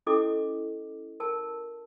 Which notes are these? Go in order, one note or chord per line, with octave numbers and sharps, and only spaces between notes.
C#4 E4 G4 A4 D#5 D6
A#4 A5